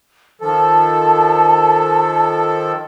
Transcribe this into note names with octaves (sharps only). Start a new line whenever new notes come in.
D#3 F3 A4 A5